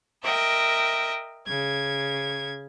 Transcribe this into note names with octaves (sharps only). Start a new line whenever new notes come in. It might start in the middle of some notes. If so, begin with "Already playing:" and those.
A#4 D#5 E5 G5
C#3 G#6